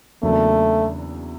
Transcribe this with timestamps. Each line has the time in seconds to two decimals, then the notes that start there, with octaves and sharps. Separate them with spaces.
0.23 E2 C#3 F#3 A3 A#3 D4